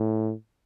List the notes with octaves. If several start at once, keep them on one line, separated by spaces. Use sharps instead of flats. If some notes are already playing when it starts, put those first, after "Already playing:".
Already playing: A2